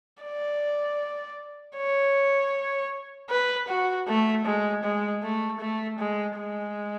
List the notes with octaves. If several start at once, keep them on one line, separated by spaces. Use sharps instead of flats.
D5
C#5
B4
F#4
A3
G#3
G#3
A3
A3
G#3
G#3